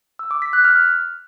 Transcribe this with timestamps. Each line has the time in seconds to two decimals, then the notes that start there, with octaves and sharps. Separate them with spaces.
0.19 E6
0.31 D6
0.42 B6
0.53 F#6
0.64 F6